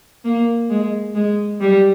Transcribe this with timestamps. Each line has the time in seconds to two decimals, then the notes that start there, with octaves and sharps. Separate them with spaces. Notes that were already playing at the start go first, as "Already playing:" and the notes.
0.25 A#3
0.70 G#3
1.15 G#3
1.60 G3